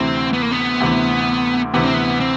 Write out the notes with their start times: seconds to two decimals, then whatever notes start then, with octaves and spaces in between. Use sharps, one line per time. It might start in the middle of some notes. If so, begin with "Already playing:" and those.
Already playing: D2 C3 E3 C4
0.33 B3
0.42 A#3
0.51 B3
0.80 D2 C3 E3
1.74 D2 C3 E3 B3
1.84 C4
1.94 B3
2.20 C4